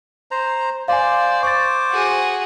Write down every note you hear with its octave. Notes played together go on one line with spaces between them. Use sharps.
C5 A#5
C5 D5 F5 G#5
C5 C#6 D6 A6
F#4 G#4